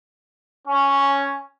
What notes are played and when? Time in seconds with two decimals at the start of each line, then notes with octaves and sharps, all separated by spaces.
0.68 C#4